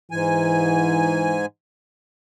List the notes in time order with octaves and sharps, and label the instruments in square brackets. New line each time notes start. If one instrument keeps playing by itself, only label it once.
[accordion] G#2 G#5 [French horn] E3